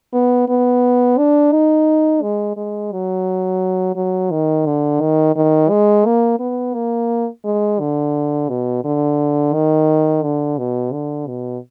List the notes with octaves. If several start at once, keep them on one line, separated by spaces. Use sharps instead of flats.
B3
B3
D4
D#4
G#3
G#3
F#3
F#3
D#3
D3
D#3
D#3
G#3
A#3
B3
A#3
G#3
D3
B2
D3
D#3
D3
B2
D3
B2